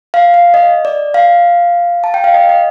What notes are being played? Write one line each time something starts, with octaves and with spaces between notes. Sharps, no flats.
F5
F5
D#5
D5
F5
A5
G5
F5
D#5
D#5